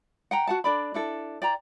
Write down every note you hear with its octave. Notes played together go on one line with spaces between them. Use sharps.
F#5 G5 A#5
F#4 F#5 A5
D4 A4 D5 B5
D4 E4 A4
D5 G5 A#5